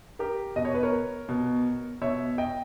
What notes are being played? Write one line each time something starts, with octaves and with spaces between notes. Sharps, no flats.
G4 A#4
B2 D#5
C#5
B4
A#4 C#5
B2
B2 C#5 E5
D#5 G5